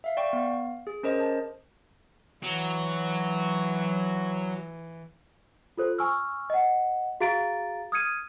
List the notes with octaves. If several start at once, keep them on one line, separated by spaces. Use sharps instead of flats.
E5 F5
D5 G5 C#6
B3 F5
G#4
C#4 A#4 C5 D#5
A5
E3 F#3
F4 A4 C5
G#5 C#6 E6 F6
D#5 F#5
F#4 G#4 F5 A#5 A6 D7
D#6 F6 G#6 C#7 D#7